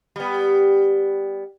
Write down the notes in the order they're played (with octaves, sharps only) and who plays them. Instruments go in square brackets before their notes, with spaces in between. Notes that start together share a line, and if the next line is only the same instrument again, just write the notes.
[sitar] G3 B3